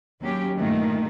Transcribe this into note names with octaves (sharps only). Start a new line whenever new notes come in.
D#2 F#3 C#4 G4
G2 A#2 D#3 G3 A3